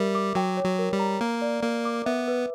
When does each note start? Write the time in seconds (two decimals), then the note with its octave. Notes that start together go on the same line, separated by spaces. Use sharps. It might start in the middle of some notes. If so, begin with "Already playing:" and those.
Already playing: G3 A#4 E5
0.15 D6
0.35 F#3 G5
0.57 C#5
0.64 F#3
0.79 A#4
0.93 G3
0.99 A#5
1.21 A#3 A#5
1.42 D5
1.63 A#3 A#4
1.85 D6
2.06 B3 E5
2.28 B4